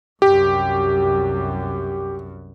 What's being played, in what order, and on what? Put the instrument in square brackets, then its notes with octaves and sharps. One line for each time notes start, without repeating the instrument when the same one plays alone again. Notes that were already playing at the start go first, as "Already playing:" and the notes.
[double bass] C2 F#2 [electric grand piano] G4